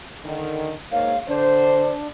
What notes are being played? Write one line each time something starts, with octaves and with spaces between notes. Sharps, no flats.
D3 D#3
G#2 A#3 C#5 F5
D3 D4 C5